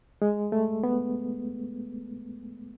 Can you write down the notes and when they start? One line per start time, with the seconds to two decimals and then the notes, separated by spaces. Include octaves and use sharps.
0.22 G#3
0.52 A3
0.84 B3